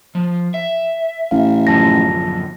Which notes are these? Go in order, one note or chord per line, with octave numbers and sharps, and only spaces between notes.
F3
E5
A1 F5
F#2 D3 F3 A5 A#6